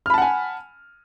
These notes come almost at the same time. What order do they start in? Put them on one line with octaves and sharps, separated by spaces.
F6 B5 A5 F#5 G#5